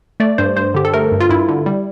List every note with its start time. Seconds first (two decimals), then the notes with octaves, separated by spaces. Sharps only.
0.20 A3 D5
0.38 G2 C5
0.56 G2 C5
0.74 D3 G4
0.85 A4
0.94 A3 A#4
1.12 G2
1.21 F4
1.29 G2 E4
1.49 D3
1.66 G3